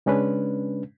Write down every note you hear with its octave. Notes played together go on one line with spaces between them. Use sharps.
C#3 G#3 C#4 D4 B4